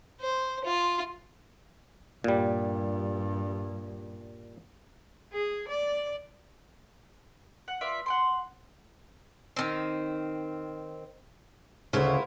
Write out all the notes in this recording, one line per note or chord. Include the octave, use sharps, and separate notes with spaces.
C5
F4
G2 A#2 G3
G#4
D5
F#5
F4 B4 D5 E5
F#5 G5 C6
D#3 C4
D2 C#3 E4 F4 A#4